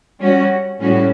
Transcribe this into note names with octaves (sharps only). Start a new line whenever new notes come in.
G3 C#4 F#4
A2 G3 C#4 F#4